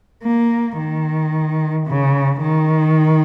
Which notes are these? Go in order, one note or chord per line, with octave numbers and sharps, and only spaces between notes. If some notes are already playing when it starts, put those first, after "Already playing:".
A#3
D#3
C#3
D#3